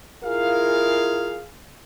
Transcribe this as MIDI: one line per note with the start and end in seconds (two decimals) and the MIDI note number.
0.24 1.38 64
0.24 1.38 65
0.24 1.49 68
0.24 1.38 70
0.24 1.49 77